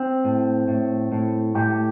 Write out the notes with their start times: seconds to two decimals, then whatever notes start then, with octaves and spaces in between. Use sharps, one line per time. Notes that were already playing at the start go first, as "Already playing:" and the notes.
Already playing: C4
0.25 A2
0.68 A2
1.12 A2
1.55 A2 G4